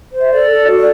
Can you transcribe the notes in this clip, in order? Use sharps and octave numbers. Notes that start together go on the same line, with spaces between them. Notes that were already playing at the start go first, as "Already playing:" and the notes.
C5
E5
A4 D5
A4
F#4
D5